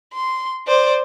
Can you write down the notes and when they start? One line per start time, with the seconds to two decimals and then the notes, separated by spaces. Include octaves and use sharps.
0.14 C6
0.67 C5 D5